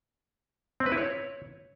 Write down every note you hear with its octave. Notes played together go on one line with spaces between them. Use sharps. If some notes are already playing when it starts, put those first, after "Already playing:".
C4
B4
E4
C#5